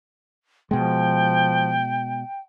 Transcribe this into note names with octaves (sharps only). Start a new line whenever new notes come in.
B2 F3 G#3 G5